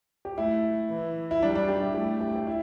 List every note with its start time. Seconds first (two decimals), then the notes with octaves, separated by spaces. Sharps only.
0.25 G4
0.38 A3 E4
0.90 E3
1.31 E4
1.42 G3 D4
1.55 D4
1.68 G4
1.82 E4
1.95 A3 G4
2.21 G4
2.36 G4
2.47 E4